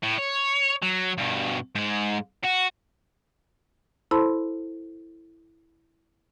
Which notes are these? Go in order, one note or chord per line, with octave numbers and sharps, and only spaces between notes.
A2
C#5
F#3
G2 B2
G#2 G#3
F#4
E4 A4 C5 A5 B5 C6